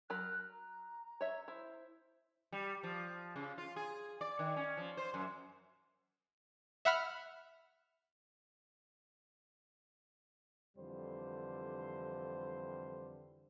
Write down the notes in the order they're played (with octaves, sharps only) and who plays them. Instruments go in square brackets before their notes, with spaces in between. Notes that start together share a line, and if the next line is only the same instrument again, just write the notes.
[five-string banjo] F#3 A#4 B5 [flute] F#6
[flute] A#5
[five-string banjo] C#5 E5
[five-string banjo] E4 [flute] C5
[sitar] G3
F3
C#3
F4
G#4
D5
D#3
C#4
F3
C5
F#2
[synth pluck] E5 F#5 B5 F6
[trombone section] F2 D3 E3 G3 C5